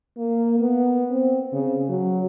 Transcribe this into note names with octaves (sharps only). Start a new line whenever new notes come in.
A#3
B3
C4
C#3
F#3